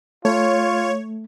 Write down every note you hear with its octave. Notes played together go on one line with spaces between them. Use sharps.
A3 F4 C#5